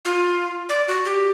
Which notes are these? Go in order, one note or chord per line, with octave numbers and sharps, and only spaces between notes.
F4
D5
F#4
G4